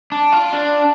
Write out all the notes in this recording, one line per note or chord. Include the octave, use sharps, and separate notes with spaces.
D4
F4
D4